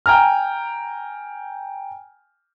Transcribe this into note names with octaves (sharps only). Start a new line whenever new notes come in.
G5 G#5 A#5 F6